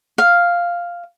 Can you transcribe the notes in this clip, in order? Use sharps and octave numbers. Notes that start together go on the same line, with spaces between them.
F5